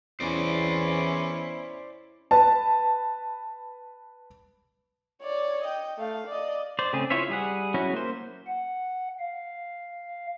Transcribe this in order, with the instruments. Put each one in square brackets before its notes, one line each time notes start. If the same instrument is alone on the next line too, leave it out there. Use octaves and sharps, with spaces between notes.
[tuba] E2 [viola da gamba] C#4 E4 [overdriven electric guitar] C5 D5
[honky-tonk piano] B4 A5
[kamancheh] C#5 D5
D#5 G5
A3 F5
D5 D#5
[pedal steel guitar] C5 D5
C#3 A3 C4 G#4
E4 F4 C5 C#5 E5
G3 G#4 F#5
F#3 C#4 E4 F#4
A#3 C5
[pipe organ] F#5
F5